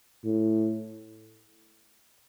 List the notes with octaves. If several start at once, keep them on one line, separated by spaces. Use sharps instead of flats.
A2